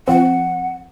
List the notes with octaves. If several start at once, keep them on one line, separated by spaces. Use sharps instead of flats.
F3 C4 F#5